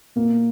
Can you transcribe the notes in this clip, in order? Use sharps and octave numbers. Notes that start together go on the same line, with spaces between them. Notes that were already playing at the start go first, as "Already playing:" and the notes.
A#2 A#3